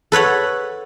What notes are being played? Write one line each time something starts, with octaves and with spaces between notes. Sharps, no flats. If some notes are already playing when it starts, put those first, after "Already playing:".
A4 B4 C#5 F#5